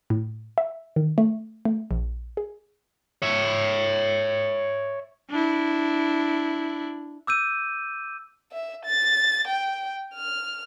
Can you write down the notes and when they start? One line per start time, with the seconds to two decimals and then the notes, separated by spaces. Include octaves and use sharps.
0.10 A2
0.58 E5
0.96 D#3
1.18 A3
1.65 A3
1.91 A#1
2.37 G#4
3.22 C#5 E5
5.31 D4 E4
7.27 D6 E6 G6 D#7
8.52 E5
8.85 A6
9.47 G5
10.15 F6